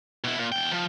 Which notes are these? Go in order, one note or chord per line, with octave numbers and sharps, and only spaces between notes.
B2 E4
A#2
E2 G5
F3